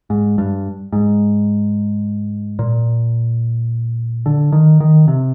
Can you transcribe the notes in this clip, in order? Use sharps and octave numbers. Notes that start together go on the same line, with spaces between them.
G#2
G2
G#2
A#2
D3
D#3
D#3
C3